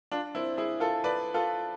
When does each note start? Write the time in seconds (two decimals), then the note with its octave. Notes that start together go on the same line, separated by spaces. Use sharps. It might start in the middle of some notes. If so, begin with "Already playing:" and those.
0.12 D4 F4
0.35 C4 E4
0.57 E4 G#4
0.80 F4 A4
1.04 B4 D5
1.34 F4 A4